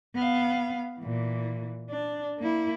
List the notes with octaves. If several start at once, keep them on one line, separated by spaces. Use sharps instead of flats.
B3 F5
A#2 E3
D4
A#3 E4